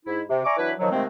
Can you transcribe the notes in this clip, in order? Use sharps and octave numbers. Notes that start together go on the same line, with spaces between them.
G#2 E4
C3
D5 E5 G#5 A#5 C#6 D6
E3 F#3 D4 E4 B4
D#3 F3 F#3
C3 D#3 F3 G#3 A3 C4